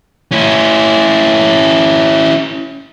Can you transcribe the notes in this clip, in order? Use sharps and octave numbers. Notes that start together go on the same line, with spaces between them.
C#4 E4